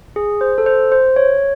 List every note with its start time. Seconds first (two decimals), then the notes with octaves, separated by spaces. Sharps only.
0.16 G#4
0.41 C5
0.58 A4
0.66 C5
0.92 C5
1.16 C#5